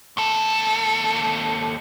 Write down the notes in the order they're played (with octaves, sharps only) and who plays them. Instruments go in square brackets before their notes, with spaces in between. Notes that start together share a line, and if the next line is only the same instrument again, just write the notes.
[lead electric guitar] D#2 A4